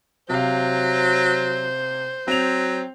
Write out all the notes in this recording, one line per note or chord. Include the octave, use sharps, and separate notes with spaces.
C3 F#3 C5 F5
F#3 C4 F7